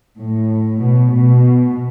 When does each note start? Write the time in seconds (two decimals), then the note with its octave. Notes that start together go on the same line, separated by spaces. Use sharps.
0.19 A2
0.81 B2
1.12 B2